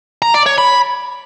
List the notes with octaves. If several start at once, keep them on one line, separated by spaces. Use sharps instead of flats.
A#5
D5
C#5
B5